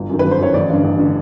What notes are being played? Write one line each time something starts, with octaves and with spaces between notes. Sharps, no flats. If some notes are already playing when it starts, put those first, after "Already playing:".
Already playing: G1
F#2 D#3
B4
G1
C5
F#2 D#3 C#5
A1 D5
G2 D3
A1
D3